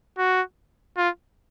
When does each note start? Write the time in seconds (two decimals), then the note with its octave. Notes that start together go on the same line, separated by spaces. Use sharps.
0.18 F#4
0.97 F4